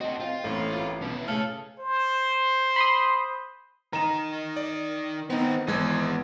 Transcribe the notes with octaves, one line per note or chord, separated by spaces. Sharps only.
C4 F#4 A4 D#5
C4 F4 F5 G5
A1 A2 A#3 C4
B3 G4 A#4
B2 C#4 E4 E5
C#3 A3 G#4 A4 F6
C5
B5 C6 D#6
D#3 D#4 A#5 E7
D5
D#3 B3 C4 D#4
G#1 E3 G#3 B3 G#6